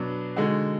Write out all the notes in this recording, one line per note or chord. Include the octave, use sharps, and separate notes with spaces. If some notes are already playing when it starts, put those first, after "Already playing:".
Already playing: B2 F#3 B3 D4
D3 G#3 D#4 F#4